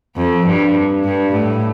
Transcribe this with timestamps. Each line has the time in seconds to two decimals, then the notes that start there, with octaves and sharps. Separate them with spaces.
0.17 F2
0.46 G2
1.04 G2
1.33 A2